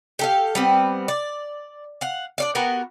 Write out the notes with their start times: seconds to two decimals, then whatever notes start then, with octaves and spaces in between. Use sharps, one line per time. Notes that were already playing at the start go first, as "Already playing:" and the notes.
0.19 G4 A4 F5
0.55 G3 B3 C4
1.08 D5
2.01 F5 F#5
2.38 D4 D5 F5
2.55 B3 F#4 G4 A#4